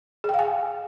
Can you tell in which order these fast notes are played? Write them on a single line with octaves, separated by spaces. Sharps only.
G#4 G5 F5 G#5